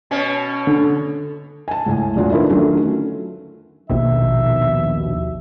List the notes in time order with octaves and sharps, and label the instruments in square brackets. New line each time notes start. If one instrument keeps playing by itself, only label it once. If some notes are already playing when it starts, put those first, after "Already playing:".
[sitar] B2 C#4
[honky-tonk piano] D3
[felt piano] G#5 A5
C#2 A2 G#5
E1 E2 F4 F#4
D3 D#3 E4 F4 A4 B4
D3 D#3 F#3 A3 C#4 F4
[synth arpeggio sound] A#1 D#2 B2 [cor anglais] E5